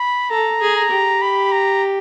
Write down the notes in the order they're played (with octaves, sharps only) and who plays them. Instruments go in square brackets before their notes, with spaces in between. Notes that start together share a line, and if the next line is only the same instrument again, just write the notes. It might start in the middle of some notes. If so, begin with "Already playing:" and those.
Already playing: [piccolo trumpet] B5
[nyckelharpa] A4 [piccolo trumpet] A#5
[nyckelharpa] G#4
[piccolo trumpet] A#5
[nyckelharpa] G4
[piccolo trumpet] B5
A#5